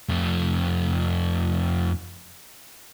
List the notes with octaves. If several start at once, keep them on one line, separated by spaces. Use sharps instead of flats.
F2 A3